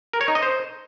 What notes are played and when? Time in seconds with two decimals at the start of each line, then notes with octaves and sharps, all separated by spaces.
0.13 A#4
0.21 C#5
0.28 D#4
0.35 D#5
0.43 C5